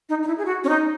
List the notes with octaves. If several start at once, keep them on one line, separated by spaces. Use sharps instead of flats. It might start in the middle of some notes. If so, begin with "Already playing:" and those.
D#4
D#4
E4
G#4
F#4
C#4
D#4